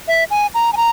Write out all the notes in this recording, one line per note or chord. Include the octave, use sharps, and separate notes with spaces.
E5
G#5
A#5
G#5
A#5